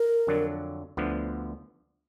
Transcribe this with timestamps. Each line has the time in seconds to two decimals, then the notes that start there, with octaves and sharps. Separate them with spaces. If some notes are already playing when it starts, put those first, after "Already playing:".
Already playing: A#4
0.27 F2 D3 F#3 D4
0.97 D2 D3 F3 B3